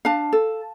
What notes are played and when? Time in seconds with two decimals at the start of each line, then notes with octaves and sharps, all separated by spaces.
0.05 D4 F5 A5
0.33 A4